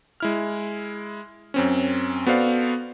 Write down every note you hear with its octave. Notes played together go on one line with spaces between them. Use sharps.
G#3 E4 F6
F#2 C4 C#4
B3 F#4 A4 C5 D5 F5